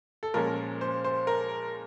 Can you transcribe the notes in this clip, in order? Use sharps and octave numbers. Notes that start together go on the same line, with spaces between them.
A4
A#2 F3 G#3 C#4 A#4
C5
C5
A#4